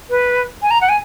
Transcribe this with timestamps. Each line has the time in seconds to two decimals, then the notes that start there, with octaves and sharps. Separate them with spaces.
0.10 B4
0.62 G#5
0.71 A#5
0.81 F#5
0.89 G#5